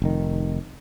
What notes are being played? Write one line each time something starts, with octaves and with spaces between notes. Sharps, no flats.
F1 D#3